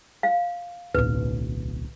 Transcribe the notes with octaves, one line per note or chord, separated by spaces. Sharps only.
F5
D1 B1 B4